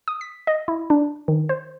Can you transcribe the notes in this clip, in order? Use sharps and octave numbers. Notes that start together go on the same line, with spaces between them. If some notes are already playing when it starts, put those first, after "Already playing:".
D#6
B6
D#5
E4
D4
D#3
C5